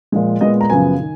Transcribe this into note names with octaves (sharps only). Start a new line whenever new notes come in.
A#2 F3 G#3
A#2 G#3 B3 D#5
A#5
F#2 C#3 F3 B3 G#5
D#3